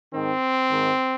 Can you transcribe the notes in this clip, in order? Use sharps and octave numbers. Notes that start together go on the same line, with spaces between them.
G#2 D#3 C4
G#2 D#3